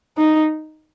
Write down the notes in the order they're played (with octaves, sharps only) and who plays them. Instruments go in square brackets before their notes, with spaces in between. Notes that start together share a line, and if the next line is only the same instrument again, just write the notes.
[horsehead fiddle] D#4